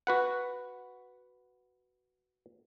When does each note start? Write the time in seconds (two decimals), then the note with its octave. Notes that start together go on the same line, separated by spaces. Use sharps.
0.07 F#4 B4 F#5